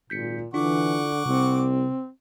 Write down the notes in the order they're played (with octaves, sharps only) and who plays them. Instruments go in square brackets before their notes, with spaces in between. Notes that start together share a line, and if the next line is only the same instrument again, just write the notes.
[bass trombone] G#1 [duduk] A#2 [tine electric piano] G6 B6 C#7
[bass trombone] D3 [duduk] E3 [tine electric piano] D4 E4 F4 [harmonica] F#5 C#6 D6
[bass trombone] C2 [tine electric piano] C3 [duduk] C4